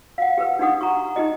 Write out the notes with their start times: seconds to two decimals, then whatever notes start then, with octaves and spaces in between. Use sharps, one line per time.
0.18 F5 F#5
0.38 G4 A#4 B4
0.59 D4 D#4 G4 F#5 D#6
0.81 A#5 C#6
1.16 D#4 G4 D#5